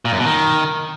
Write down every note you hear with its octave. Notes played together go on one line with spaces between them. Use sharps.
A#2
F#2
B2
D#3